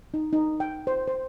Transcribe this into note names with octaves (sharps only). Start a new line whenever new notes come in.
D#4
D#4
G5
C5
C5